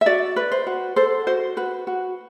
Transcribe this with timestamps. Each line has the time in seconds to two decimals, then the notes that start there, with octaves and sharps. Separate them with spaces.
0.01 E5
0.06 F#4 D5
0.36 B4
0.52 C5
0.67 F#4
0.96 A4 C5
1.27 F#4 C5
1.57 F#4 B4
1.87 F#4